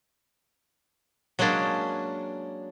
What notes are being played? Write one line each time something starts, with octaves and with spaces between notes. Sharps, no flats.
F#3 G#3 A#3 C#4 D4